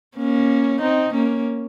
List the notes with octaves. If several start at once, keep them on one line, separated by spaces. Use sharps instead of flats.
A#3 C#4
C4 D#4
A#3 C#4